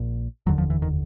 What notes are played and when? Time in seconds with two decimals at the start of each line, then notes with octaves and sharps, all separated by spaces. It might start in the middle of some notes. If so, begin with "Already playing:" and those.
Already playing: A#1 A#2
0.46 F1 D#2 D3 F#3
0.58 F3
0.70 E3
0.82 D#3